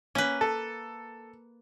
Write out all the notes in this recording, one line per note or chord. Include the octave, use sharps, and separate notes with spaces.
A#3 C#4 B4
A4